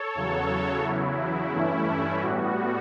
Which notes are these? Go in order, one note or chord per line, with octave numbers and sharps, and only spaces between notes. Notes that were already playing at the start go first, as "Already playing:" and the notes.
Already playing: A4 C#5
E2 C#3 F#3
E2 C#3 F#3 E4
G2 E3 A3 C#4
A2 G3 B3 F#4